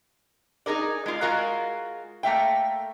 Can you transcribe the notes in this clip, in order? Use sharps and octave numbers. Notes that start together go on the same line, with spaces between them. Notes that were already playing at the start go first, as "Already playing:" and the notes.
D#4 G#4 A#4 D5
G#3 F4
G#3 F4 F#4 A#4 F5 A#5
A3 A#3 E5 G5